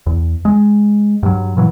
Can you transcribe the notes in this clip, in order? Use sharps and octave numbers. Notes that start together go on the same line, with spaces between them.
E2
G#3
G2 F#3
A#2 E3 F#3